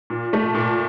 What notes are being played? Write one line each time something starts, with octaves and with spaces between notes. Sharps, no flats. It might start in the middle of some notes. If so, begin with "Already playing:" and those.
A#2
A3
A#2